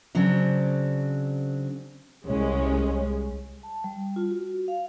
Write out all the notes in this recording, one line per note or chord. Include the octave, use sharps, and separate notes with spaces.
C#3 F#3 C4 D4
C2 G#3 C#4
A5
G3
F4
F#4
F5